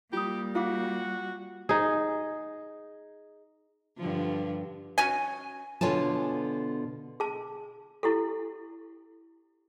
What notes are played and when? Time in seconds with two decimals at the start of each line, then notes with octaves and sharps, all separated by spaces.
0.13 G3 A#3 F4 G4 D#6
0.55 F4 F#4 F5 D6
1.69 D#4 G#4
3.98 G2 D3 F3
4.98 C#4 F#4 G#5
5.81 B2 D3 F4 C#5 G#5 A5
7.20 G#4 A5
8.03 E4 G4 A4